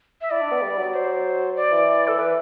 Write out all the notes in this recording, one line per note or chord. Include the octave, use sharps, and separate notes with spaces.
E5
E4 D5
D4
B3
G3
F#3
C5
D5
E3
A4
E3 B4